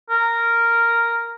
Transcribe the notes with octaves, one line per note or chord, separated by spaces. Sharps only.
A#4